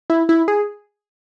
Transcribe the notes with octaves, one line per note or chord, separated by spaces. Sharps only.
E4
E4
G#4